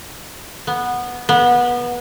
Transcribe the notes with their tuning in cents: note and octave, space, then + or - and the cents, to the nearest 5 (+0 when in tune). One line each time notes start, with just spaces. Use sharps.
B3 -10
B3 -25